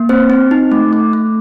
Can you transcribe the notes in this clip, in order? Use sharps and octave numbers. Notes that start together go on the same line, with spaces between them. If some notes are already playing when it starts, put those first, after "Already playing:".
Already playing: A#3
C4 C5
C4
D#4
A3
A3
A3